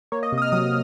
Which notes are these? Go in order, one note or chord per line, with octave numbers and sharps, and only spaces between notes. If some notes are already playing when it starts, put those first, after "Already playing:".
A#3 C#5
D#5
C3
D#6
F6
F#3 D#6